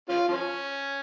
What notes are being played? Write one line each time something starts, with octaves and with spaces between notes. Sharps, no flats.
C#4 F4
F3 C#4